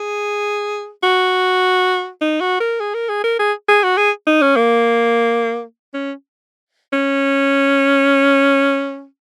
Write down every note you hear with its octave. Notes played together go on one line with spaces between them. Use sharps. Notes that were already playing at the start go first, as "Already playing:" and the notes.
Already playing: G#4
F#4
D#4
F#4
A#4
G#4
A#4
G#4
A#4
G#4
G#4
F#4
G#4
D#4
C#4
A#3
C#4
C#4